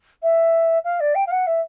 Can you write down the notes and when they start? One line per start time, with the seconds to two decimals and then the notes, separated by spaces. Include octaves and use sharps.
0.22 E5
0.84 F5
1.00 D5
1.14 G5
1.26 F5
1.31 F#5
1.46 E5